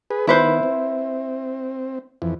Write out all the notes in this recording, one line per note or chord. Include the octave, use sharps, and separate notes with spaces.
G#4 B4
D#3 B3 E4 B4 C5
C4
F2 E3